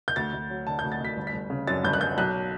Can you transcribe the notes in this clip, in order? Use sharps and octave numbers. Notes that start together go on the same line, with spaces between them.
G6
D2 A6
D2
F#3
D3 A5
D2 G6
A6
D2 B6
G1
B6
G1
C#3
F#2 A6
G1 G6
F#6
G1 G6
B1 F#6